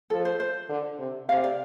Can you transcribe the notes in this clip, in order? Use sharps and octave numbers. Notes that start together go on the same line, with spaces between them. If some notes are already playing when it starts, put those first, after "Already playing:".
F3 A4
C5
C5
D3
C3
C3 F5
D5